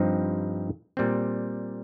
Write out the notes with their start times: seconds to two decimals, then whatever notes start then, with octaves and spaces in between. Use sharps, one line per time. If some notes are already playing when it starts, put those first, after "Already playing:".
Already playing: G2 F3 C4 D#4
0.97 A#2 G3 C4